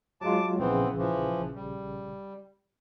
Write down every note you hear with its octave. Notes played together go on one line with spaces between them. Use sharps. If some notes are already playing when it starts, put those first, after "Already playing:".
F#3 G#3 F4 A5 D6
A#1 C#3 E3 B3 C4
E3 F3
G3